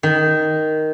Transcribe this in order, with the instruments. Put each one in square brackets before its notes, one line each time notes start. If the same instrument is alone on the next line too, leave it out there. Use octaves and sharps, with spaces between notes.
[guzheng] D#3